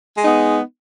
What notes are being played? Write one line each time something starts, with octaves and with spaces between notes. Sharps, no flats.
G#3 B3 D#4